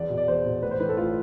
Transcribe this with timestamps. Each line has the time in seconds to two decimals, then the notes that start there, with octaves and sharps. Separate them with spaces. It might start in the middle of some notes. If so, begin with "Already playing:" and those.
Already playing: E2 D5
0.10 B2
0.18 D5
0.28 E2 C5
0.45 B2
0.62 A1 B4
0.71 C5
0.80 A2 E3 B4
0.89 A4
0.97 A1 F4